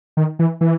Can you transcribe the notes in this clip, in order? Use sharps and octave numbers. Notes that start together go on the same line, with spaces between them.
D#3
E3
E3